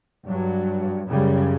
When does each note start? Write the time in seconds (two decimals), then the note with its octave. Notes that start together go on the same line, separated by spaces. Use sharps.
0.28 G2 F#3
1.09 F#2 C#3 G3